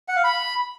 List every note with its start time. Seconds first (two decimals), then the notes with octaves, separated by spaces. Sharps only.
0.08 F#5
0.16 F5
0.24 B5